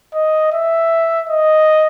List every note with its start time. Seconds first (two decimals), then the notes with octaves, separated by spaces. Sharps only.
0.14 D#5
0.52 E5
1.29 D#5